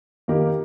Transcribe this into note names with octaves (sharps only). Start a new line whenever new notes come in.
D#3 A#3 D#4 G4 A#4